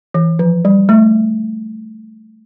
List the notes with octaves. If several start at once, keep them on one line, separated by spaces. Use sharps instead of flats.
E3
F3
G3
A3